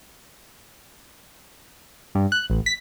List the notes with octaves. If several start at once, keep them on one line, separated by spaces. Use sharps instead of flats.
G2
F#6
A1
B6